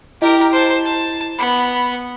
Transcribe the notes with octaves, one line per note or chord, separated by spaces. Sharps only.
E4 G4 A#4 D#5
C5 A5
A5
B3 B5